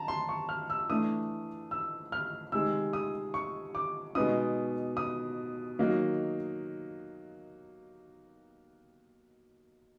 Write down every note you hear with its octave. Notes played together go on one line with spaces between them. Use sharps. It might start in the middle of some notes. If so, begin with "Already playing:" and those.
Already playing: A5 A#5
C6
C#6
F6
E6
E3 A3 D4 D#6
E6
F6
C3 D#3 G#3 C4 E6
D#6
C#6
D6
B2 G#3 B3 D#4 D#6
D#6
D#3 F#3 A#3 D#4